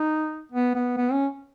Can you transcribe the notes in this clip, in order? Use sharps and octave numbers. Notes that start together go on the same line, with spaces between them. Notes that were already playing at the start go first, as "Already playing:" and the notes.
Already playing: D#4
B3
B3
B3
C#4